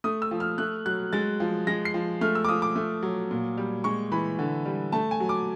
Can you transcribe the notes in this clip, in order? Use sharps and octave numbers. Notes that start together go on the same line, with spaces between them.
A3 D#6
E6
F3
F6
A3 F#6
F#3 F#6
G#3 A6
F3
G#3 A#6
C7
F3
A3 F6
E6
D6
F3 D#6
D6
A3
F#3
A#2
G3
G#3 C#6
E3 B5
D3
G3
A3 A5
G#5
F#3
D6